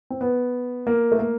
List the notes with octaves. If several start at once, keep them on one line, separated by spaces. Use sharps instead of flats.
C4
B3
A#3
A3
A#3